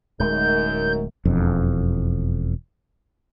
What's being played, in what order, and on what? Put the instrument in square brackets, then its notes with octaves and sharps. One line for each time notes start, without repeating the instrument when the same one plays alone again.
[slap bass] D1 G#3 A3 [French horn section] F#2 D#4 A#4 [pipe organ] G6
[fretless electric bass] E1 F2